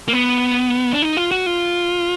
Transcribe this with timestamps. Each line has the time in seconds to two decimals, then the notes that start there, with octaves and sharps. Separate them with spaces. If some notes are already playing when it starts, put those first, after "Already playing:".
0.08 A#3
0.13 B3
0.93 D4
1.02 D#4
1.17 F4
1.31 F#4
1.46 F4